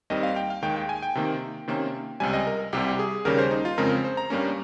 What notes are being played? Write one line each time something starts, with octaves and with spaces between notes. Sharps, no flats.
D#2 D#3 G3 C4 D#5
F5
G5
F5
D#2 D#3 G#3 G5
G5
G#5
G5
C3 D#3 A#3
C3 D#3 A#3 C#4
C#2 C3 G3 G#5
D#5
A#4
C2 C3 G3 G4
G#4
D#2 C#3 G3 A#3 C#4 A#4
C5
D#4
F4
F2 C#3 G#3 C4 A#4
C5
A#5
G2 G3 A#3 C#4